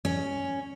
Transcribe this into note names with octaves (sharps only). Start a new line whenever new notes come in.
C#4